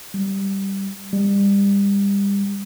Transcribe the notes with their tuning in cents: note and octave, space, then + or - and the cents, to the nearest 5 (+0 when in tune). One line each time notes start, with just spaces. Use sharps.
G3 -5
G3 +30